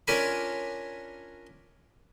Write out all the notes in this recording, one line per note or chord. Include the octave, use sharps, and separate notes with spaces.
C#4 D4 F4 A#4 G#5 B5